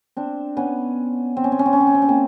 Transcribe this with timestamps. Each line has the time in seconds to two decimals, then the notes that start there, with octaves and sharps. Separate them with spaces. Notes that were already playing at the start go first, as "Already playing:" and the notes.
0.17 C4 D4
0.57 B3 C#4
1.37 C4
1.44 C#4
1.52 C4
1.59 C#4
1.66 C4
1.73 C#4
1.80 C4
1.87 C#4
1.94 C4
2.02 C#4
2.09 A#3 C4